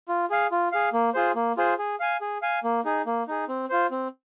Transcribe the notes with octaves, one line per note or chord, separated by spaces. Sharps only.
F4
G#4 F5
F4
G#4 F5
A#3
F4 G#4 C5
A#3
F4 G#4 C5
G#4
F5 G#5
G#4
F5 G#5
A#3
D#4 G#4
A#3
D#4 G#4
C4
F4 C5
C4